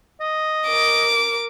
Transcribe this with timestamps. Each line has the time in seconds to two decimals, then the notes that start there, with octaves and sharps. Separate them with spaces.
0.21 D#5
0.67 A#4 D6